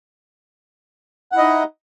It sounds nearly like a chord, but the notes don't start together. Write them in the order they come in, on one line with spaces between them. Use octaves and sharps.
F#5 E4 D#5 D#4